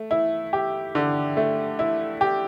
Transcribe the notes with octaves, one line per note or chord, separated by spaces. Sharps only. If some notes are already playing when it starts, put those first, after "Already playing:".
Already playing: A3
E4
G4
D3
A3
E4
G4